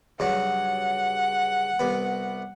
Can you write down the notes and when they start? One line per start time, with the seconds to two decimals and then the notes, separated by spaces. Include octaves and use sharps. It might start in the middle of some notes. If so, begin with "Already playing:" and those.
0.20 G2 C#3 F#3 F#5
1.79 C2 B3